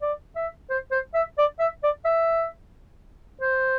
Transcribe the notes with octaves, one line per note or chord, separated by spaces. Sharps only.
D5
E5
C5
C5
E5
D5
E5
D5
E5
C5